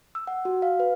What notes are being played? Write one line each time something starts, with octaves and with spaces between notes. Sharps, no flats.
E6
F#5
F#4
F5
B4